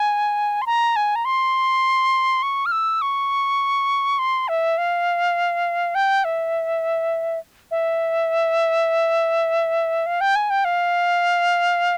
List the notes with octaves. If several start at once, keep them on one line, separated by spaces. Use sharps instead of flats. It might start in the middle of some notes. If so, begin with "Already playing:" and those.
Already playing: G#5
C6
A#5
G#5
A#5
C6
C#6
F6
E6
C#6
C6
E5
F5
G5
E5
E5
F5
G5
G#5
G5
F5